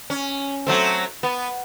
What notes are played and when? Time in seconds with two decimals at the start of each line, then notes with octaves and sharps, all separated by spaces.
0.10 C#4
0.67 F#3 A3 C4
1.23 B3